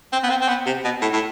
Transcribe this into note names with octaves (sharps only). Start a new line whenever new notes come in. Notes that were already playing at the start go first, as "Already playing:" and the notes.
C4
B3
C4
C4
B3
C3
B2
A2
A2